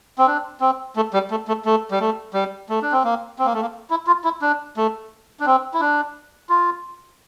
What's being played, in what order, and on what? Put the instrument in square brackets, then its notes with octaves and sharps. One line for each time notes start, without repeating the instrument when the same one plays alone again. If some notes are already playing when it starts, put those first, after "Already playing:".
[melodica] C4
D4
C4
A3
G3
A3
A3
A3
G3
A3
G3
A3
D4
C4
A#3
C4
A#3
A3
A#3
E4
F4
E4
D4
A3
D4
C4
E4
D4
F4